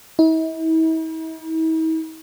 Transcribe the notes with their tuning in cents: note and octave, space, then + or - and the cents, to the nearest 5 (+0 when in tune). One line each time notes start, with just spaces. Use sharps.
E4 -45